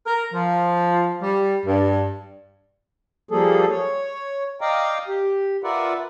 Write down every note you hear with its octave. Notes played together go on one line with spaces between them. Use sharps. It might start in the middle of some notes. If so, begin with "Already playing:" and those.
A#4
F3
G3
G2
F3 G3 A#3 G#4 A4
C#5
D5 D#5 F5 G5 A#5
G4
F4 A#4 B4 D5 E5 F#5